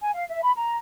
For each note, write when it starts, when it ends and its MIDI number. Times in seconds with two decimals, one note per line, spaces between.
0.02 0.11 80
0.14 0.24 77
0.30 0.41 76
0.43 0.52 83
0.56 0.76 82